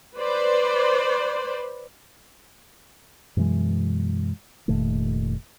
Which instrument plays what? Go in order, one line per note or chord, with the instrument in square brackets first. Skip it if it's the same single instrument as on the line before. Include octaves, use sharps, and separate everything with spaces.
[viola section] B4 C5 D5
[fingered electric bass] F#2 B2 E3 G#3
F1 A#2 D#3 A3